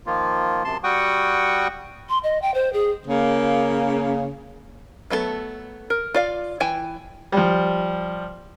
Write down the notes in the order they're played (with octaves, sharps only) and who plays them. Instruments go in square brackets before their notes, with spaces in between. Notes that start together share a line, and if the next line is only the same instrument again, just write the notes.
[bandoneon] D#3 F3 A#3 F4
F#2 C3 A5 C6
G3 F#4 F#5 G5 C#6 D#6
[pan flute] C6
D#5
G5
C5
G#4
[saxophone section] C#3 A#3
[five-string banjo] F#3 A3 B3 E4 A4
A#4
F4 D5 F5
E3 E4 G5 G#5
[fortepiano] F3 G3